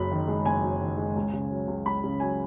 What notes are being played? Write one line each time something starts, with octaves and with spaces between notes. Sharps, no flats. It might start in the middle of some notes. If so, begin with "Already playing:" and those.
Already playing: F#1 F#2 B5
D#3
G#3
F#1 G#5
F#2
D#3
G#3
C#2
C#3
F#3
C#2
C#2 B5
C#3
F#3 G#5